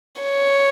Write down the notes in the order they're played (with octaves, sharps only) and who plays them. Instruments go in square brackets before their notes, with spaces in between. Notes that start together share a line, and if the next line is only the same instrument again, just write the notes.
[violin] C#5